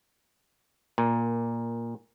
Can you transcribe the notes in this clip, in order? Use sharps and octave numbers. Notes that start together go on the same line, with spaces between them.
A#2